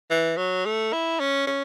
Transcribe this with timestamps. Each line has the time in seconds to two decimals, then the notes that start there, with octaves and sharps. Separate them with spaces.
0.10 E3
0.37 F#3
0.66 A3
0.93 E4
1.20 C#4
1.47 C#4